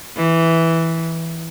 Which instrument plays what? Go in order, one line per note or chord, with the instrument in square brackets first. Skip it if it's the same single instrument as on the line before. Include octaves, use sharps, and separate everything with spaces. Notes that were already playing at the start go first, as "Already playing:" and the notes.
[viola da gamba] E3